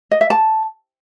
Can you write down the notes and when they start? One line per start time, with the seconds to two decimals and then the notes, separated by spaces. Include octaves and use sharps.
0.11 D#5
0.21 E5
0.30 A5